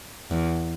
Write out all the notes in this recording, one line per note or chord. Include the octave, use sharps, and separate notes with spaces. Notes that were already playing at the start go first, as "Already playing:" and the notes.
E2